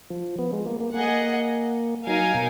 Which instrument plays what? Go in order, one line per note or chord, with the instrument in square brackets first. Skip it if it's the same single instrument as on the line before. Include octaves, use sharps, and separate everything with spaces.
[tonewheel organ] F3
B3
G#3
A#3
A#3
[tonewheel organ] A#3 [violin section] G#4 D#5 F#5
[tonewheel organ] F#3 [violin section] D#4 A#4 F5 G#5
[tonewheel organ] B2